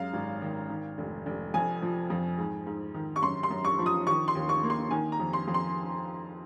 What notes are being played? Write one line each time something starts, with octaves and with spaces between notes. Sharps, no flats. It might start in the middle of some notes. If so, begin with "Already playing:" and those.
Already playing: F#2 G#3 F5
G#1
D#3
D#3
F1
F1
F2 G#5
F3
F2
G#2
G#2
D#3
C#6
F#2 C6
C6
F#2
C#6
F3
D#6
D#3 C#6
C6
D#2
C#6
A#3
C6
D#3 G#5
A#5
F2
C6
F2
C6